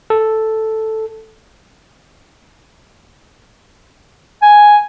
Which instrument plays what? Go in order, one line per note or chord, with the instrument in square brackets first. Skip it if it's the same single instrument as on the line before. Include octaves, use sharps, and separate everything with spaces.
[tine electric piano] A4
[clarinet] G#5